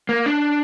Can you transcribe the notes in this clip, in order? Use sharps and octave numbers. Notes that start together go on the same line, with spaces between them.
A#3
D4